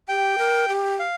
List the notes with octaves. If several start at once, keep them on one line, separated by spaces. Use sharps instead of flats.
G4 G5
A#4
G4
F5